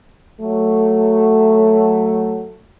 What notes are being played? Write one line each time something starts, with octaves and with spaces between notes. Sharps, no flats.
F#3 A3